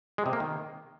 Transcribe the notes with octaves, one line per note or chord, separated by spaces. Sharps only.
G#3
C3
A#3
D#3